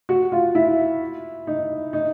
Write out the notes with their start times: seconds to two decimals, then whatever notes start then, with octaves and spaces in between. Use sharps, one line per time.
0.09 F#4
0.32 F4
0.55 E4
1.47 D#4
1.93 D#4